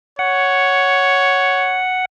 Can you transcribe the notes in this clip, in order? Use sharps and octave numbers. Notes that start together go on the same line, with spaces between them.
C#5 F#5